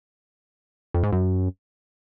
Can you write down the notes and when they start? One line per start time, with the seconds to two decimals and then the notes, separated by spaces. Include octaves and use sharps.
0.94 F2
1.03 G#2
1.12 F#2